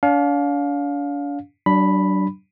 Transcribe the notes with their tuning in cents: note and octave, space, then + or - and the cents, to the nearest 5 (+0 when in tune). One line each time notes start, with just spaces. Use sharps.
D4 -40 F5 +20
F#3 +45 D4 +0 B5 +0